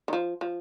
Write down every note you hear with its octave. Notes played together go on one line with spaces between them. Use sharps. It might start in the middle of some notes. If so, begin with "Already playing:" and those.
D#3
F3
F3